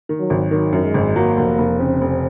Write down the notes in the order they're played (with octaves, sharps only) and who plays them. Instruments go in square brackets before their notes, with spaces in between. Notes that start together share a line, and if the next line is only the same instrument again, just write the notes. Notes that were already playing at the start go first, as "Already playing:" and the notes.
[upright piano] D#3
[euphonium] F#3
[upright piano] G#1
[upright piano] D#3 [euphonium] F#3
[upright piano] F#2
[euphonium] G#3
[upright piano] G#1
[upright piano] F#3 [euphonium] A#3
[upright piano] F1
F1
[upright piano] C#3 [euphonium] C4
[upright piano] F1